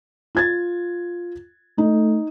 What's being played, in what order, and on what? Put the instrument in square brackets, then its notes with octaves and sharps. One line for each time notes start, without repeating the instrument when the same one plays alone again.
[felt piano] F4 G#6 A6
[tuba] A3 [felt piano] D#4